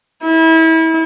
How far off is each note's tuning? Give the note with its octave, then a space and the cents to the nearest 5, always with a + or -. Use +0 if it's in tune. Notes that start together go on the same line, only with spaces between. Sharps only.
E4 -30